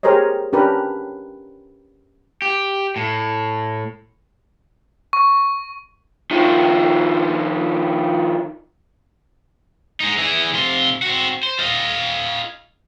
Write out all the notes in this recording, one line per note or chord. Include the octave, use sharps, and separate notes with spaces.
G4 G#4 A#4 C5 C#5 D#5
C#4 D4 G4 A#4 B4
G4
A2
C#6
D#3 F3
G#3 D#4
E3 G#4
C3 F4
C4 F#4
C5
F4 D#5